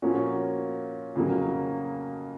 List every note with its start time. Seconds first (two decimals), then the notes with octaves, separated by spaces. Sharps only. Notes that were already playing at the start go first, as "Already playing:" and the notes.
0.02 A#2 F3 A#3 C#4 F#4
1.16 F2 C#3 F#3 A#3